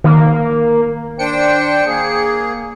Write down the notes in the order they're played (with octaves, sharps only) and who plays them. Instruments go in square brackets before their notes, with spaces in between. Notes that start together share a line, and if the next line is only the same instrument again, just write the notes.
[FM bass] D#3 [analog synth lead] A#3
[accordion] D4 C5 G5 [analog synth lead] C#7
[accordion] A#3 G#4